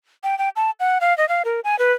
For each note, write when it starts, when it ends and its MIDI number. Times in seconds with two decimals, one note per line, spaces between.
0.24 0.38 79
0.38 0.49 79
0.56 0.71 81
0.80 0.98 78
1.01 1.16 77
1.18 1.28 75
1.29 1.43 77
1.45 1.60 70
1.64 1.78 80
1.79 1.93 71